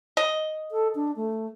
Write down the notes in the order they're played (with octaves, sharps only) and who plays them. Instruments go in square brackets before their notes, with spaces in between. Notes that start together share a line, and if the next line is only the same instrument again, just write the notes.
[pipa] D#5
[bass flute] A4
D4
A3